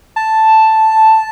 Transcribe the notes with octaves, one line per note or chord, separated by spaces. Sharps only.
A5